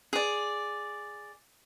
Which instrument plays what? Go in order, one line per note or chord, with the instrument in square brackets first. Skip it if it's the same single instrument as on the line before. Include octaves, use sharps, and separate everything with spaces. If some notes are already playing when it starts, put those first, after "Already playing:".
[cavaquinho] G#4 D5